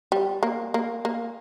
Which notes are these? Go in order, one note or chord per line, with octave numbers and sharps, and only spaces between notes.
G3
A#3
A#3
A#3